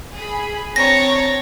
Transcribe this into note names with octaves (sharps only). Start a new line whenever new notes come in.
G#4 B5
C4 D4 C#5 A#5 A6 A#6